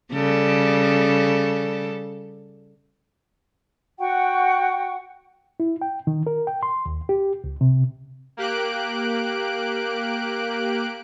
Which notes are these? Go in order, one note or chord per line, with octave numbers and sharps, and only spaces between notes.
C#3 G3 A4
F#4 F#5 G5 C#6
E4
G5
D#3
A#4
G5
C6
D#2
G4
C#2
C3
A#3 G4 F#6 D7